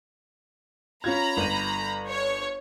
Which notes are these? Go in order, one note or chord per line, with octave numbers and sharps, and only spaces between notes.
C#4 F4 A#5 B5 G#6
G1 D#7
C#5